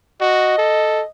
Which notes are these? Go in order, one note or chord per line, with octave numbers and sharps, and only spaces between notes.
F#4 D#5
A4